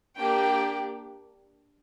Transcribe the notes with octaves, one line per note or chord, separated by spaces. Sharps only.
A#3 D4 G4 G5